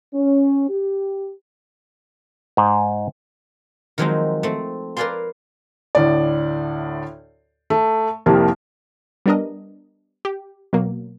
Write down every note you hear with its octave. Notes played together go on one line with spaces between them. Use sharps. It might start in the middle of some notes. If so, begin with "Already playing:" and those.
C#4
G4
G#2
D#3 F3 F#3 G#3 C4 D#4
A3 C4
A#4 B4 D5 F5 G#5 C6
D2 A2 D5
A3
C2 F2 C3 F3 G3 A#3
G3 B3 D4 A#4 D#5
G4
B2 F#3 A#3